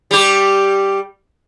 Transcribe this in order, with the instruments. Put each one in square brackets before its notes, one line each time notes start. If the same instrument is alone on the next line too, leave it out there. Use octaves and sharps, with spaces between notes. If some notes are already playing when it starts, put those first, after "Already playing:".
[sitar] G3 G4